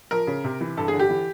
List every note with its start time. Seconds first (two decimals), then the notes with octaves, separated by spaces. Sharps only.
0.11 F3 A#4
0.27 C#3
0.44 C3
0.61 E3
0.77 G2 A4
0.88 G#4
0.93 D3
0.99 G4
1.09 E3